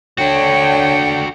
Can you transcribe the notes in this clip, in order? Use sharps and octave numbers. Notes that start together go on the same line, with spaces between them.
D3 D4 F#4 C#5 G5